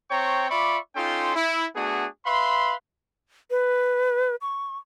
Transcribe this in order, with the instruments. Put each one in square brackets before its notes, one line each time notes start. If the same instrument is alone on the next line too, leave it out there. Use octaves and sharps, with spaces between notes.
[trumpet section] C4 C5 C#5 G5 A#5 C#6
F4 D5 E5 B5 C#6 D6
C#4 D#4 F4 A4 G5 C6
E4
A3 B3 D4 F#4 G#4
B4 E5 F5 B5 C6
[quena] B4
C#6